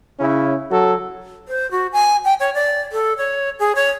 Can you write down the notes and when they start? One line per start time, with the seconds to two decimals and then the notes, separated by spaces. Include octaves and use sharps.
0.19 C#3 C#4 E4
0.70 F#3 F#4 A4
1.48 C5
1.71 F#4
1.93 G#5
2.25 G5
2.40 C#5
2.54 D5
2.92 A4
3.18 C#5
3.59 G#4
3.75 C#5